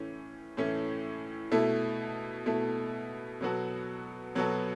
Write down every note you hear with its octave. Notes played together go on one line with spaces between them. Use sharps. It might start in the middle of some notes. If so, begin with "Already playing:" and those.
Already playing: A2 E3 A3 C#4
A2 E3 A3 C#4
B2 A3 E4 A4
B2 A3 E4 A4
B2 F#3 B3 F#4 A4
B2 F#3 B3 F#4 A4